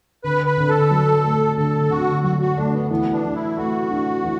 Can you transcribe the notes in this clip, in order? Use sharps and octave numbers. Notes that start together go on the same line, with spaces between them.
D3 B4
B4
D3
A4
F#3
A3
D3 A4
D3 F#4
F#3 F#4
F#4
A3 D4
B3
E3 B3
D4
E3
E4
A3 F#4
D4
E3